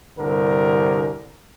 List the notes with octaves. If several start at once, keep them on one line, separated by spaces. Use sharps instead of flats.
C2 G2 D3 A#4